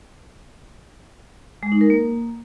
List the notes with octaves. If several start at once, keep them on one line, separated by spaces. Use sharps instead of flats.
G#3
D#4
A#4
A#3